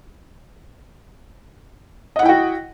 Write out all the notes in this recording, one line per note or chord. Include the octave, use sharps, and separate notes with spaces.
E4 F#4 D#5 F#5 G5